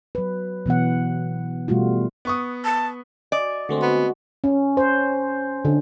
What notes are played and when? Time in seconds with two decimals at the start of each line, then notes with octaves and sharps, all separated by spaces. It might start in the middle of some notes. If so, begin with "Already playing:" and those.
0.15 F#3 B4
0.66 B2 E3 B3 F#5
1.68 B2 G3 A3 F4 F#4
2.25 B3 C#6 D#6
2.64 A5
3.32 D5 D#5 G#5
3.69 D3 G#3 A3 C4 F#4
3.82 B3
4.44 C#4
4.77 C5
5.65 D3